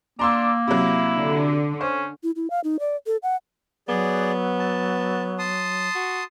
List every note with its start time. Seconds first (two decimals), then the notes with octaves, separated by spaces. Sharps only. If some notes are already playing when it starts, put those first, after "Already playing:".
0.19 A#3 D4 A#5 C6 E6
0.68 C3 F#3 E4
1.17 D3
1.81 C#4 C5
2.23 E4
2.36 E4
2.50 F5
2.64 D#4
2.80 D5
3.07 A4
3.23 F#5
3.88 F#3 B3 G#4 D5
4.59 A5
5.39 A5 C6 D#6
5.95 F#4